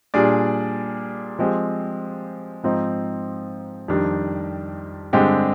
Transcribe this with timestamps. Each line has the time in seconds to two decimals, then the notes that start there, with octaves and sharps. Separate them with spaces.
0.14 A#2 G3 D4 G#4 D5
1.39 F3 G#3 C4 G4
2.63 G#2 F3 C4 D#4
3.88 F2 D#3 G3 D4
5.13 G2 D3 G#3 C4 G4